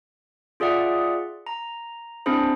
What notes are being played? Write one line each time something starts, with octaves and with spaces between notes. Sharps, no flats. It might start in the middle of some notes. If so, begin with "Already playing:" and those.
F4 G#4 D5 E5 F#5
A#5
C4 D4 E4 G#4 C5